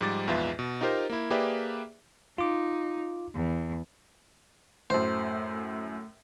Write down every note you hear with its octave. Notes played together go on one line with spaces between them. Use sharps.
G#2 F3 G3 D6 A6
A#1 E2 G#2 F4 B4 E5
B2
D#4 F4 G4 A#4 C5
A#3 E4
A#3 G4 G#4 B4 D5 E5
D#4 F4 D6
E2
F#2 A2 A3 C5